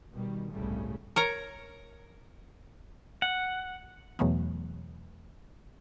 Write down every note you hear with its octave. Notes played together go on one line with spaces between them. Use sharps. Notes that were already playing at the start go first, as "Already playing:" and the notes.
B2 D#3 G3
G1 C2 A2 C#3 G3 A3
A#4 C#5 A#5
F#5
E2 B2 E3 F#3 A3 B3